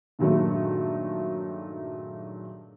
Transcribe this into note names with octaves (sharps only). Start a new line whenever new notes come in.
G2 A#2 D#3 F#3 G#3 A3